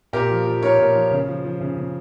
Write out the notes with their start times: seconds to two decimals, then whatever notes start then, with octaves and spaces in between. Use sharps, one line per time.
0.13 A#2 G4 A#4
0.30 F3
0.46 F3
0.62 A#2 A#4 C#5
0.79 A#2
0.95 F3
1.11 C#3
1.28 F3
1.44 F3
1.60 C#3
1.76 C#3